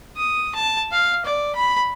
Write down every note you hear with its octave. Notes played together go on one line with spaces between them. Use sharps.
D#6
A5
F5
D5
B5